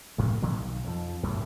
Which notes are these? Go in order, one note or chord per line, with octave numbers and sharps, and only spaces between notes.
A2 F#3
A2 D3 F#3 B3
B1
F2 F3
F#2 A2 C#3 E3